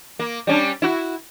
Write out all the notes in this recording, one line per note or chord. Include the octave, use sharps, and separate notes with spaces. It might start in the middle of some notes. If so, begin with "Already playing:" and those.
A#3
G3 C#4 D4
E4 F#4